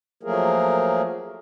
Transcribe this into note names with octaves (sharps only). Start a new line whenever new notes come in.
F3 F#3 A3 A#3 G#4 A#4